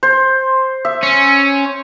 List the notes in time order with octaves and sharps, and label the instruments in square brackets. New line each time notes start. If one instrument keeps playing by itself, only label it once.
[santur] C5
E5
[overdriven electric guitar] C#4